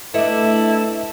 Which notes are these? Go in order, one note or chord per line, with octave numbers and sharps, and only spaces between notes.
A3 D4 E4 A4 B4 D#5 E5